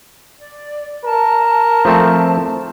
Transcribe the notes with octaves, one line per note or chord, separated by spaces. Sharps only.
D5
A#4 A5
F3 A3 C4